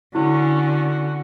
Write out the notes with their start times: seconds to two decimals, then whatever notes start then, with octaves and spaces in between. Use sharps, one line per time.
0.15 D3 C#4 E4 F#4